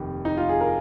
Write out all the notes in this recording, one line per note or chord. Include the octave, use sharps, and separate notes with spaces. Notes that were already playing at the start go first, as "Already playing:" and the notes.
Already playing: F1 D#2 D#3
D#4
F4
G#4
A#4